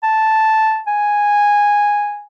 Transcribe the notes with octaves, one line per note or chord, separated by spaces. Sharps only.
A5
G#5